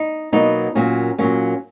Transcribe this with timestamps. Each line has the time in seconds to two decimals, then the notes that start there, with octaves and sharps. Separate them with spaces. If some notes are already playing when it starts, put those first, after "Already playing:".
Already playing: D#4
0.32 B2 F#3 A#3 D#4
0.75 A#2 F#3 A#3 C#4
1.18 A#2 F#3 A#3 C#4